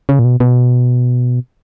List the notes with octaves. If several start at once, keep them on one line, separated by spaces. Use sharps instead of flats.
C#3
A#2
B2
B2